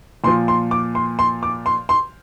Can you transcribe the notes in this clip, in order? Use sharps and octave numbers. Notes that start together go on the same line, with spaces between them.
A#2 F3 C6
C6
D6
C6
C6
D6
C6
C6